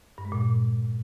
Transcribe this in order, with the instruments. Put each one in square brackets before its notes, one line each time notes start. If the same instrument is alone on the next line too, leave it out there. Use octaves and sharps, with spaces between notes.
[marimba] G2
G#3
A#2